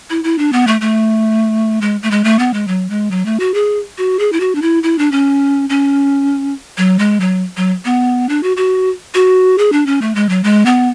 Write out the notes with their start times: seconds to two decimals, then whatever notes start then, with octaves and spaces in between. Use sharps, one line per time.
0.10 E4
0.24 E4
0.38 D4
0.53 B3
0.67 A3
0.81 A3
1.81 G#3
2.03 A3
2.11 G#3
2.24 A3
2.39 B3
2.54 G#3
2.68 F#3
2.90 G#3
3.11 F#3
3.25 A3
3.40 F#4
3.54 G#4
3.98 F#4
4.19 G#4
4.33 E4
4.40 F#4
4.55 D4
4.62 E4
4.83 E4
4.99 D4
5.12 C#4
5.70 C#4
6.78 F#3
6.99 G#3
7.20 F#3
7.57 F#3
7.85 B3
8.29 D4
8.43 F#4
8.57 F#4
9.14 F#4
9.58 G#4
9.72 D4
9.86 C#4
10.02 A3
10.15 G#3
10.29 F#3
10.44 G#3
10.66 B3